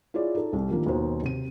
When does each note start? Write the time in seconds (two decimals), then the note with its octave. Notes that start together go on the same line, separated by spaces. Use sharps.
0.14 E4 F4 G#4 C#5 D5
0.35 D#4 A4
0.53 C2
0.69 D#3 F3 A#3 D4
0.86 D#2 B2 D#4 C5
1.23 C3 D#7